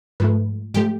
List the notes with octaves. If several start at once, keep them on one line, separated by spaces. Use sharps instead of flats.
G#2 F3 A3 B4
G#2 F3 A3 G4